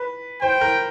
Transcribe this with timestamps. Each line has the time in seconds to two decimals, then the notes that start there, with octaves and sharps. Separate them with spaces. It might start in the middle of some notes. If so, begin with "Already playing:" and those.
Already playing: B4
0.41 C5 G5
0.61 A#4